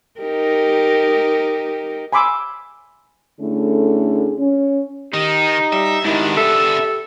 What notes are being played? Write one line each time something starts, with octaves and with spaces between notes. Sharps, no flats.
D#4 G4 A#4
G#5 B5 C6 D6 E6
D3 A3 C#4 E4 G#4 A4
C#4
D#3 D#4 G4
G3 E5
G#2 D#3 B3 D4 E4
A4 E5